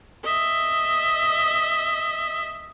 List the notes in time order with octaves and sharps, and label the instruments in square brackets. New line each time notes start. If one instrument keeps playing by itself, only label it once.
[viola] D#5 E5